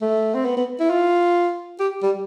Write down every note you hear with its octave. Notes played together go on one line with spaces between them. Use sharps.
A3
C4
B3
B3
E4
F4
G4
G3